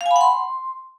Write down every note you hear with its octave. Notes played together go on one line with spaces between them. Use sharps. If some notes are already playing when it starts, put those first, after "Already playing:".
F5
G#5
B5
F#5
C6